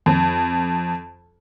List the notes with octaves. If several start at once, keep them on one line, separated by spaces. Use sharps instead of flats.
F2